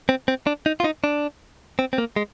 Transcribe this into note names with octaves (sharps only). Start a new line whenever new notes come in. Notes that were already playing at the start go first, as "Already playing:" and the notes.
C4
C4
D4
D#4
F4
D#4
D4
C4
C4
A#3
G#3